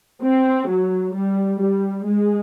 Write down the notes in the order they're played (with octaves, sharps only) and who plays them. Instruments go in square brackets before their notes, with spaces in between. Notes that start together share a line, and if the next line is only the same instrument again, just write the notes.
[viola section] C4
F#3
G3
G3
G#3